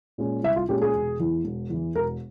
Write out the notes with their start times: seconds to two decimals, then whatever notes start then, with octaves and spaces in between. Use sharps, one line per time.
0.18 A#2 G#3 C#4
0.43 C2 E5
0.56 F4
0.69 A#2 G#3 C#4 G4
0.82 G#4
0.94 E1
1.19 E2 E3
1.44 E1
1.70 E2 E3
1.95 E1 A#4